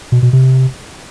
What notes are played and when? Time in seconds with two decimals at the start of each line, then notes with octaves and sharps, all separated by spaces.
0.12 B2
0.23 B2
0.33 C3